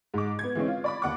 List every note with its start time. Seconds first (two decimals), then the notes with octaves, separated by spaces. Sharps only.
0.14 G#2 D6
0.39 B3 G#6
0.55 E3 G#3 C4 C#4
0.68 F4
0.84 D5 B5 D6
1.02 D#2 F#5 D6